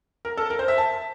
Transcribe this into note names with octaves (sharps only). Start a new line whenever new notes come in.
A#4
A4
A#4
C5
E5
A5